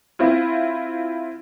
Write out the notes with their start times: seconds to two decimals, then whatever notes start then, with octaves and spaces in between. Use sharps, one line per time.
0.19 C4 E4 F4